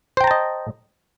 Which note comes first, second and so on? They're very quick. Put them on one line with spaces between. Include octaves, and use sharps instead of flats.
C5 G5 A#5 A5 D#5